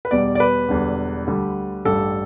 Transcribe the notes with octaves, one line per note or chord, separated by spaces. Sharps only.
B4
E2 B2 G3 D5
D5
B4
E1 E2 D3 G3
D2 D3 G3
A1 G2 G3 A4